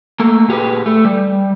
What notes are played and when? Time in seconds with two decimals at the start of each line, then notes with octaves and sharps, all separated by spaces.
0.20 A3 A#3
0.48 A#2 G4 G#4 B4
0.86 A3
1.05 G3